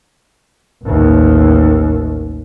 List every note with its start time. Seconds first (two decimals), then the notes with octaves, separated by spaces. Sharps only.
0.85 A1 D#2